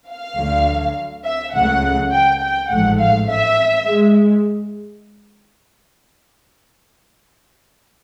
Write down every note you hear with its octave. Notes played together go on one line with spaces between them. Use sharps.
F5
D2 D3 F#3 A3
E5
C#2 C#3 F#3 A3 F#5
G5
G5
A1 G#2 F3 A3 F#5
F5
E5
G#3